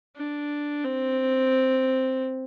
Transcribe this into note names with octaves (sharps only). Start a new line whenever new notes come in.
D4
C4